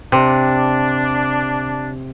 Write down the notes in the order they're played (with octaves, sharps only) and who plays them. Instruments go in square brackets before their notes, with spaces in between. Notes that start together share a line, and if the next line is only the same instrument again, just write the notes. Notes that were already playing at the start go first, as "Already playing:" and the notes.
[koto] C3 [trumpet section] D4